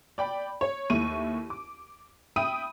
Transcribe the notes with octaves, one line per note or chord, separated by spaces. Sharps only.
D5 G5 B5
C#5
D#2 A3 E4 C#6 D#7
D6
E5 G5 B5 D#6 D#7